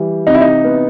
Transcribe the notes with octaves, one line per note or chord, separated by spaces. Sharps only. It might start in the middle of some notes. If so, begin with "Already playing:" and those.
Already playing: E3 G3
C3 D#4
E4
D#4
B3